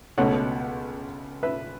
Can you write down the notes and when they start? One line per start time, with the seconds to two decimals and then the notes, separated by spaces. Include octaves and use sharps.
0.18 C#2 B2 A3 C#5 F#5
1.43 B4 E5